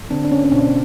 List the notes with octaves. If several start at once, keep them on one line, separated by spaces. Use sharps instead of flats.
D3 C4 D4
D4
A#3 C#4
C#4
B2 C4 D4